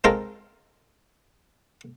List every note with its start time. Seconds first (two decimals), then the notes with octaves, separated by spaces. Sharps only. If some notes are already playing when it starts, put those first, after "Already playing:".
0.04 G#3 C4 F4 A4 A#4